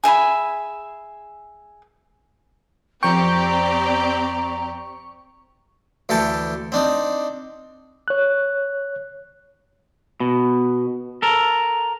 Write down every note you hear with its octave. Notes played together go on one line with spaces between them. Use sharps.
G#4 E5 G#5 B5
F2 C4 G4 D5 G5 A#5 C#6
D2 E3 A4 G5 A5
C4 D4 D#4
C#5 F#6
B2
A4 A#4